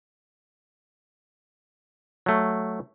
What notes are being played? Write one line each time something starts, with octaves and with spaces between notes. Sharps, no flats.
F#3 A3